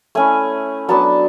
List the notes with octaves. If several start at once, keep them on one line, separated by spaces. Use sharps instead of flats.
A3 C#4 E4 G#5
F#3 B3 D4 A5